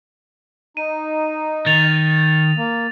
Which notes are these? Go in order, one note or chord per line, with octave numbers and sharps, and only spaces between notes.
D#4 D#7
D#3 A6 F7
A#3